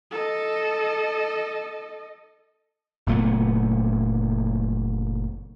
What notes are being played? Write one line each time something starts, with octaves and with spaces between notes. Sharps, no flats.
A4 D#5
F#1 A#2 A3 B3